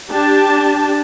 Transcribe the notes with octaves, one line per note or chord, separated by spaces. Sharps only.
D4 G4 A5